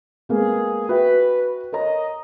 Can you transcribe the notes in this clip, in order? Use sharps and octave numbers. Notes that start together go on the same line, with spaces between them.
G#3 A#3 B3 G#4
F#4 B4 E5 G5
A#4 C#5 D#5 A#5